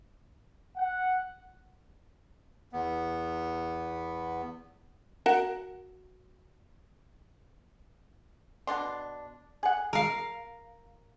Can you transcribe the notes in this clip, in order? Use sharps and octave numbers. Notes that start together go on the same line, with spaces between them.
F#5
E2 B3
F#4 A#4 F#5
B2 D4 C6
G#4 F#5
A#4 F5